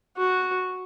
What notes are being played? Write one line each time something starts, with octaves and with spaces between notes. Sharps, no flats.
F#4